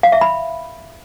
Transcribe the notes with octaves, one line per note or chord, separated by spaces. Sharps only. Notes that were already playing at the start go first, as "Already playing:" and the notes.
F5
E5
B5